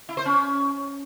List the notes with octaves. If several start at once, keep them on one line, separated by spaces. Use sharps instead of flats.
E4
C5
C#4